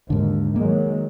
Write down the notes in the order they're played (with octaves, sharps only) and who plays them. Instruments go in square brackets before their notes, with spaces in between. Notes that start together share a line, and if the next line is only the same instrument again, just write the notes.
[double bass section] D#2 [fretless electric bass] G#2 D3
[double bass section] D#3 F#3 G#3 [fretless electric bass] A#3